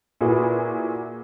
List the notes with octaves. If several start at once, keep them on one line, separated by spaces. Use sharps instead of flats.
A#2 E4 F#4 G#4 B4